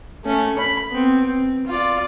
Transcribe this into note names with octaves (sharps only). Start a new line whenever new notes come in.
A3 C#4
B5
B3 C4
C4
F4 D5